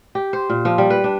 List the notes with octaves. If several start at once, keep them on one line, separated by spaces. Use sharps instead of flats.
G4
C5
A#2
F3
G3
B4
D4